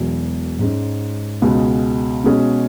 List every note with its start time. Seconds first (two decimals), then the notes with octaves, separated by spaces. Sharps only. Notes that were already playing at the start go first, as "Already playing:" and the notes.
Already playing: E1 E2 B2 F#3
0.59 G#2 G#3 C#4
1.42 C#2 B2 G#3
2.24 B2 G#3 C#4 G#4